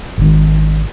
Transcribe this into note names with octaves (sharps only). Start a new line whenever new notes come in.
G#1 D#3